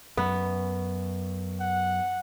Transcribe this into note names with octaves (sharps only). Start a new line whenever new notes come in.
F#2 B3
F#5